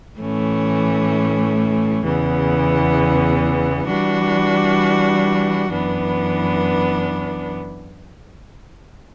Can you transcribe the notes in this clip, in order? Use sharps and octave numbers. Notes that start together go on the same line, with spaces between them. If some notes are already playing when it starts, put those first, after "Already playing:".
A2 E3 A3 C#4
E2 C#3 E3 B3
E3 G3 D4 F#4
F#2 E3 B3 D4